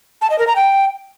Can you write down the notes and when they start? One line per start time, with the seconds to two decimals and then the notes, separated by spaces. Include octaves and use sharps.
0.22 A5
0.30 D#5
0.39 A#4
0.47 A#5
0.56 G5